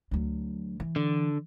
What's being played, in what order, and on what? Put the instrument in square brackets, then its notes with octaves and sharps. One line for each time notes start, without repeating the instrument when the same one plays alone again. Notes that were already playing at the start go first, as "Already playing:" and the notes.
[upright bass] D2 F#3
E3
[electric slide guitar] D3